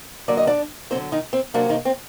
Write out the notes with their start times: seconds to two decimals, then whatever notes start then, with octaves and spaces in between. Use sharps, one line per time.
0.28 D3 F#3 A#3 D5
0.37 D#5
0.47 D4 D5
0.91 D3 F#3 A#3 C4 C5
1.12 D#3 D#4
1.33 C4
1.54 C3 F#3 A#3 D4
1.69 D#3 D#4
1.85 C4